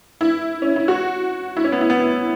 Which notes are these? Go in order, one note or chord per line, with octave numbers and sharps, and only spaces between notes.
E4
C#4
E4
F#4
E4
C#4
B3
E4
B3